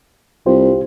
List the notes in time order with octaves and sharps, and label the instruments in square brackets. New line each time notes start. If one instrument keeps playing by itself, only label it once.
[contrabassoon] C2 [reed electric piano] F4 G4 C5